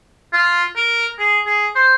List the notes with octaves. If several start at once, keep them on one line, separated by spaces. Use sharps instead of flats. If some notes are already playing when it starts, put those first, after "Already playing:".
F4
A#4
G#4
G#4
C5